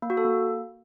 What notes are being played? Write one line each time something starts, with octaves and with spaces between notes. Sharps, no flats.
A#3
F#4
A4
A#3